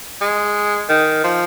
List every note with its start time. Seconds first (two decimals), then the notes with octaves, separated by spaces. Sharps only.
0.21 G#3
0.89 D#3
1.23 F3